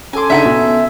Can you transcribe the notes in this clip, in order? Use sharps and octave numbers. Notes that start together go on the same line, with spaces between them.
C#4 A4 G#5 C6 D6
C#3 D4 D#4 E5 F#5 G#5
B2